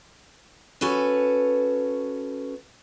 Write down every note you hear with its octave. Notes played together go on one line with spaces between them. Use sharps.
C#4 F#4 A4 B4